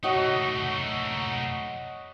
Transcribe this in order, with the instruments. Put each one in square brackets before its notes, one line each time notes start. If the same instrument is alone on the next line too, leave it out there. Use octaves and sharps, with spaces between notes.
[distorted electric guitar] A3 D#4 [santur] F#4 C#5 D#5